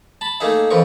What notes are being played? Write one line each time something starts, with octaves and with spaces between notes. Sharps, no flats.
A5 B5
A3 A#3 D#4 G#4 E5
F2 E3 F3 A#4 C#6